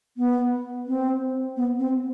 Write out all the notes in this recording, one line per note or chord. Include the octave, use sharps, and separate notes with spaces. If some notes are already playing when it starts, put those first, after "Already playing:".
B3
C4
B3
C4